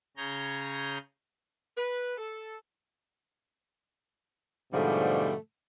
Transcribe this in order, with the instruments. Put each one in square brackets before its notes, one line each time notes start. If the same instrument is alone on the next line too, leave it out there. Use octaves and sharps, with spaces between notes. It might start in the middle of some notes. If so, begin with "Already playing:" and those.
[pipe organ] C#3 G#4 C#5 A#5 G6
[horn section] B4
A4
G#2 B2 D3 F3 G3 A3